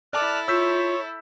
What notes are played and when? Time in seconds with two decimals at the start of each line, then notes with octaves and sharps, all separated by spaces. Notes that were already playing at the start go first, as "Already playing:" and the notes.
0.13 E4 A4 D5 A5 D6 F6 F#6
0.48 F4 C#5 E6 G6 B6